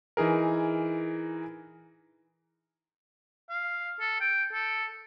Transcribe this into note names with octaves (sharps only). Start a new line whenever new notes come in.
E3 D#4 G#4 A#4
F5
A4
G5
A4